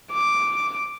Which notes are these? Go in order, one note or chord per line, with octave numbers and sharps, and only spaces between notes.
D6